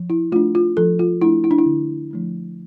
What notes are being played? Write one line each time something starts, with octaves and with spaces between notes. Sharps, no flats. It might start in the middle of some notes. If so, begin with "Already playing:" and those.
Already playing: F3
E4
A3 D4 F4
F4
F3 A4
F4
A3 D4 E4
E4
D4
E4
D3
F3 A3 D4